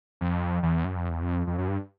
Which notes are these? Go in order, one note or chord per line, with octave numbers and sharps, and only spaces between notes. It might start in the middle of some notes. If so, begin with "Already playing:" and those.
F2
E2
F#2
F2
E2
F2
F2
F#2
G2